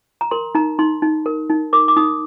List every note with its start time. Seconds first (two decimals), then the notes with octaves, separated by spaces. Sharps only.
0.21 A#5
0.31 A#4 C6
0.55 D#4 A#5
0.79 D#4 C6
1.02 D#4
1.26 A#4
1.50 D#4
1.73 A#4 D6
1.88 D6
1.96 D#4 D#6